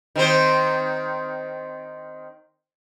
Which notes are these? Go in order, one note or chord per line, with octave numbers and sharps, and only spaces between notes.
D#3 C4 C5